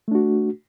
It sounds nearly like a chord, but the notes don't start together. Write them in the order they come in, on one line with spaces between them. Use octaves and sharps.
A3 D4 F#4